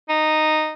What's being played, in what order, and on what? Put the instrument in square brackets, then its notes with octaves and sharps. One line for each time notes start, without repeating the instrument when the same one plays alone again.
[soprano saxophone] D#4